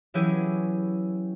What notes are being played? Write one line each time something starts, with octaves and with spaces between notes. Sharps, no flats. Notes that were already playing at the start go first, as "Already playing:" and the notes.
E3 F#3 C#4 E4 G4 G#4